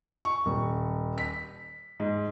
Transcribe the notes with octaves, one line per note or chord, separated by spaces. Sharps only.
C#6
D#1
B6
G#2